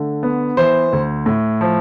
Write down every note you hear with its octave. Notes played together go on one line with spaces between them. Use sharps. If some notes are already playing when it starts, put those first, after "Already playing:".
Already playing: D3 A3
B3
E3 C5
D2
A2
F3